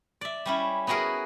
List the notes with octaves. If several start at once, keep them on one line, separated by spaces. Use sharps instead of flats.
D5 E5
G3 C#4 E4
B3 E4 F#4 G#4 A#4